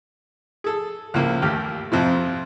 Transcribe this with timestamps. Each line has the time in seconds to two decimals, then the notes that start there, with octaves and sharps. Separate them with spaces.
0.64 G#4 A4
1.14 C#2 F3 A#3 E4
1.42 D#2 A3 G4 F6
1.92 F2 C3 F3